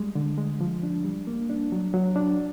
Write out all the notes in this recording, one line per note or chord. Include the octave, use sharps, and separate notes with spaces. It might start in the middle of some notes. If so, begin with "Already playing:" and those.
Already playing: G3 G#3
D3
G#3
F3
D4
G3
A#3
D4
F#3
F#3
D4